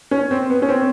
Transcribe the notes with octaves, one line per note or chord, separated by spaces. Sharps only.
C#4
C4
B3
C#4
C4